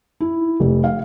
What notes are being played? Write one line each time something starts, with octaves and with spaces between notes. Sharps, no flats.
E4
F1
F5